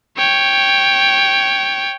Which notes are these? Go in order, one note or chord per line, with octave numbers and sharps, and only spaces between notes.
C#5 G5